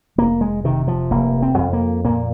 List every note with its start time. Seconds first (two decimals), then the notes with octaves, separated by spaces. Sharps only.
0.18 F1 A#3
0.41 G#3
0.64 C3 D#3
0.88 F3
1.11 F1 A#3
1.42 C4
1.58 F2
1.73 A#3
2.05 A#2 A#3